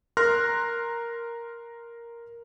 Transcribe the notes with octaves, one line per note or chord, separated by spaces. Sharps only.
A#4 A#5 C6 F6 F#6 A#6